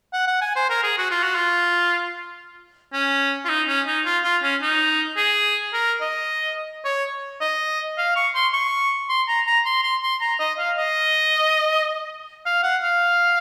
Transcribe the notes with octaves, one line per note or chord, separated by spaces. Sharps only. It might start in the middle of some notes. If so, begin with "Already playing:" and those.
F#5
F#5
G#5
C5
A#4
G#4
F#4
F4
F#4
F4
C#4
F4
D#4
C#4
D#4
F4
F4
C#4
D#4
G#4
A#4
D#5
C#5
D#5
F5
C#6
C6
C#6
C6
A#5
A#5
C6
C6
C6
A#5
D#5
F5
D#5
F5
F#5
F5